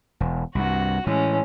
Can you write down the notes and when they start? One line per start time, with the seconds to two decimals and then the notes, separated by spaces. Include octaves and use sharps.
0.20 E1
0.55 C2 G2 F#4
1.07 A2 E3 G#3 C#4